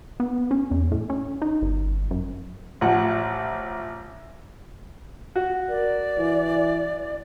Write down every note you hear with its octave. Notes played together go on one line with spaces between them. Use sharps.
B3
C#4
E2
A2
C#4
D#4
G1
F#2
A1 F3 F#5
F#4
A#4 D5
E3